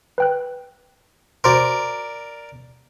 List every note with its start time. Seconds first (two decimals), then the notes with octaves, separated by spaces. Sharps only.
0.18 B4 G5 F#6
1.44 F#4 A#4 C5 D5 C6